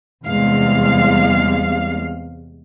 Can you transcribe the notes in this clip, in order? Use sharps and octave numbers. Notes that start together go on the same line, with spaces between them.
E2 C3 G3 G#3 F5